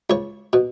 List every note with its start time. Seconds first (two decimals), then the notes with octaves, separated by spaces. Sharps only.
0.10 C#2 C#5
0.53 B2